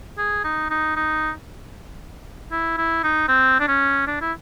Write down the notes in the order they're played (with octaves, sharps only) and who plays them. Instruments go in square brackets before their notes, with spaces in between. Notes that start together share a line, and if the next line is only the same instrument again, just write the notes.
[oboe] G#4
D#4
D#4
D#4
E4
E4
D#4
C4
D4
C#4
D4
E4